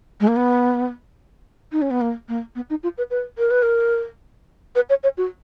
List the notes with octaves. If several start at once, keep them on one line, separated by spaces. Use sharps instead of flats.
G#3
A#3
B3
D#4
C#4
B3
A#3
A#3
B3
D#4
F4
B4
B4
A#4
B4
A#4
B4
C#5
C#5
F#4